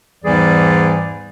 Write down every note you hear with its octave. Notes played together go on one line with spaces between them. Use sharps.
E2 G#2 E3 G3 G#4 D5